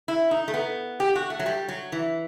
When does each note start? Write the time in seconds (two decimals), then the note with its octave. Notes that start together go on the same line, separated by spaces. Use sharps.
0.08 E4
0.31 D#4
0.48 A3
0.54 B3
1.00 G4
1.15 F#4
1.30 A3
1.39 F#3
1.46 G3
1.69 F#3
1.92 E3